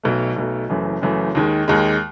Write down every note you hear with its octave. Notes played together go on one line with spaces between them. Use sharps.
B1 B2 A3
B1 B2 A3
F#1 F#2 E3 A3
F#1 F#2 E3 A3
D#2 D#3 G#3
D#2 D#3 G#3